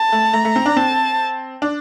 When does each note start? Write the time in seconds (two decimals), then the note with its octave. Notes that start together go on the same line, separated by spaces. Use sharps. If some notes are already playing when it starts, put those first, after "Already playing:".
Already playing: A5
0.12 A3
0.33 A3 A#5
0.45 A3
0.56 C4
0.66 D4
0.76 C4 A5
1.62 D4